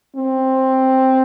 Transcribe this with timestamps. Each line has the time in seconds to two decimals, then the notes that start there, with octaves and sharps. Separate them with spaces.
0.17 C4